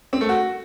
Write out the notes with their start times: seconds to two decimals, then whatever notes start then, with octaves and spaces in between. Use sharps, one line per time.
0.13 C4
0.21 A3
0.29 F#4